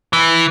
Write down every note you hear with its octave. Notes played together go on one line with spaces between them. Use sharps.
E3